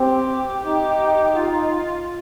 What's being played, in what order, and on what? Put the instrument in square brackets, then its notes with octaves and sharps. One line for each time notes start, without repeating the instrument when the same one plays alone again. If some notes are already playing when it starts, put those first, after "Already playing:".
Already playing: [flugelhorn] C4 [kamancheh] G4
[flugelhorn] D#4 [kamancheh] G4
[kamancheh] F4